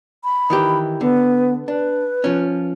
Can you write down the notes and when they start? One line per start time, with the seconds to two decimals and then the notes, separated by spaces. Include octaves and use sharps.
0.24 B5
0.50 D#3 E3 G4
1.01 D3 B3
1.68 D4 B4
2.24 F3 C#4